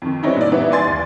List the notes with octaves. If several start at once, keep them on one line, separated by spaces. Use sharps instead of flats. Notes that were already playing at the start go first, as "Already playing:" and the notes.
F2 D#3
E3 G3 C4 C#4 D#4 E4
A#2 D5
E3 G3 B3 D#4 D5 E5
D5 G#5 C6 A6
D#2